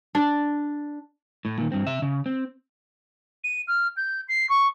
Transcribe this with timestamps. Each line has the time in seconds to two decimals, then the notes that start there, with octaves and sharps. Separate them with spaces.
0.15 D4
1.45 A2
1.58 A#2 D#3
1.72 G2 C4
1.87 C3 E5
2.02 C#3
2.26 C4
3.44 D#7
3.68 F6
3.97 G6
4.28 C7
4.49 C#6